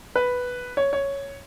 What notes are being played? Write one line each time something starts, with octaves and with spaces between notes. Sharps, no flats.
B4
C#5
C#5